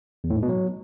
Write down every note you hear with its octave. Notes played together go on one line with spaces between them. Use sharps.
E2
A2
G#2
B2
F#3